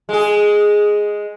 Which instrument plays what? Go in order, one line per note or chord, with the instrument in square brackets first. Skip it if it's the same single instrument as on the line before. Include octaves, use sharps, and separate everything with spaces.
[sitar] G#3 G#4